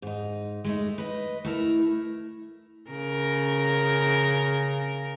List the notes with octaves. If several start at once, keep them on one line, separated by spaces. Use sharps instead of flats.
G#2 D#4
G#3 A3 D#4
B4 D#5
A3 E4 A#4
C#3 A#4